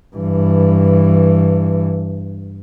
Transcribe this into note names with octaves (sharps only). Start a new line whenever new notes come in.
G2 E3